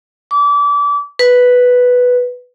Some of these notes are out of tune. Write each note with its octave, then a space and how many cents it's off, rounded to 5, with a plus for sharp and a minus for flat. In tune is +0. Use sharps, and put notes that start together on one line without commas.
D6 -30
B4 +0